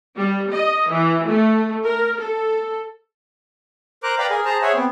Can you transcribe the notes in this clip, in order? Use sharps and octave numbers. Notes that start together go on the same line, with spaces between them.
G3
D#5
E3
A3
A#4
A4
A#4 C5 A#5 D6 F#6
B4 D5 F5 G5 A#5 B5
G#4 A#4 G#5
G#4 C5 A5 A#5
G#4 C5 C#5 E5 F#5 G#5
B3 C4